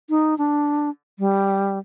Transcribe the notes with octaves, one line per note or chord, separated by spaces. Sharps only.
D#4
D4
G3